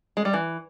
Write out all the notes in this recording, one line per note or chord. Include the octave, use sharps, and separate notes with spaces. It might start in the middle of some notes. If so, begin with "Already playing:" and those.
G#3
G3
E3